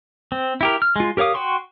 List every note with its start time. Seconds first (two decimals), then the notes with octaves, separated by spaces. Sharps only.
0.32 C4
0.61 E4 G4 A#4
0.82 F6
0.96 G#3 F4
1.17 G4 A#4 C#5 F5 D#6
1.34 F#4 G5 C6 C#6